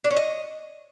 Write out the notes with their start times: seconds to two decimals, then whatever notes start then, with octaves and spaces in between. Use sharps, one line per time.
0.04 D4
0.10 C#4
0.17 D#5